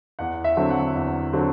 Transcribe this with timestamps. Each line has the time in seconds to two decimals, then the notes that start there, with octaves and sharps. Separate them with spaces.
0.19 E2 F#5
0.44 E5
0.57 D3 F#3 C4
0.71 F#5
0.95 E2
1.33 D3 F#3 C4